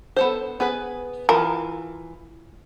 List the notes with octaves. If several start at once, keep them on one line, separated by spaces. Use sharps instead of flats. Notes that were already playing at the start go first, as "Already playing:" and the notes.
B3 A4 C5
B3 G#4 B4
E3 F4 A#4